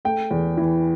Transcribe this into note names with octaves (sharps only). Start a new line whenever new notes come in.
A3 G5
E2
E3